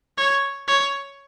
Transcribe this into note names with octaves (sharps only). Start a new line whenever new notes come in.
C#5
C#5